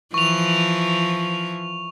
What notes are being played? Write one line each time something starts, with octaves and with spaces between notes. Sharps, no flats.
E3 F3 C#6 F7